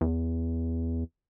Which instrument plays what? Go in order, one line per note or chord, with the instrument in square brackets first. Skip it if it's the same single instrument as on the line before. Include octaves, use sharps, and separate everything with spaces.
[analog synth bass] E2